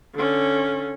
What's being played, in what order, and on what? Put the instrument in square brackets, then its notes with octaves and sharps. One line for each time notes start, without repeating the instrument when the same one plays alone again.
[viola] D3 C#4